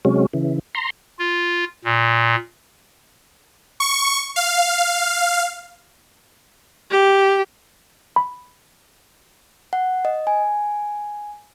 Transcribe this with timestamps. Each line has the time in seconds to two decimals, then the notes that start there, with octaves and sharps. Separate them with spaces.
0.05 C3 F#3 G#3 C#4
0.33 C#3 E3
0.75 A#5 C6
1.19 F4
1.85 A#2
3.80 C#6
4.36 F5
6.91 G4
8.16 B5
9.73 F#5
10.05 D#5
10.27 G#5